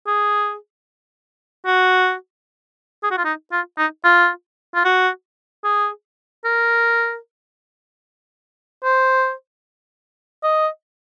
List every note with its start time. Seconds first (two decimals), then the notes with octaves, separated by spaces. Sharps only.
0.07 G#4
1.66 F#4
3.03 G#4
3.11 F#4
3.18 F4
3.25 D#4
3.52 F4
3.78 D#4
4.04 F4
4.75 F4
4.85 F#4
5.64 G#4
6.45 A#4
8.84 C5
10.43 D#5